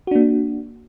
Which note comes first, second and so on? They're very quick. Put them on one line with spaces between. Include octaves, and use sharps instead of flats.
F#4 D4 A#3